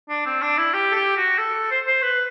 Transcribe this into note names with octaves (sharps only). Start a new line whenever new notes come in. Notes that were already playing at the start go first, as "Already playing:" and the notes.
D4
C4
D4
E4
G4
A4
G4
F#4
A4
C5
C5
B4